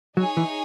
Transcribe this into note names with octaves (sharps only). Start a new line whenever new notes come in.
F#3 D#4 G#4 C#5 G#5
E3